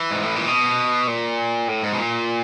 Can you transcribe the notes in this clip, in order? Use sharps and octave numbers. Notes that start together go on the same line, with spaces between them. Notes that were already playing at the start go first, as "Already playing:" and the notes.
Already playing: E3
G#2
A2
A#2
B2
A#2
A2
G#2
B2
A#2